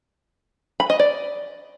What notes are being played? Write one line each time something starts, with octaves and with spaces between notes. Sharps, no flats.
B5
D#5
D5